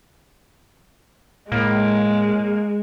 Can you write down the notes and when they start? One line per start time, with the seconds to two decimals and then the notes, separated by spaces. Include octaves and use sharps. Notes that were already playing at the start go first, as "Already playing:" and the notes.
1.52 A2 G#3 A#3